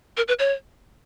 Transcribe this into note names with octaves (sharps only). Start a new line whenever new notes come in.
A#4
B4
C#5